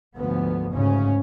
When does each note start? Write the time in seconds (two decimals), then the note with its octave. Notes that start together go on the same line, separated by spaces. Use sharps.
0.16 D2 G#2 F3 B3
0.71 D2 G#2 C#3 C#4